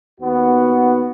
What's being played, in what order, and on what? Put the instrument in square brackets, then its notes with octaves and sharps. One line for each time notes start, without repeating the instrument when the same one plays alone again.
[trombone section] D#2 B3 F#4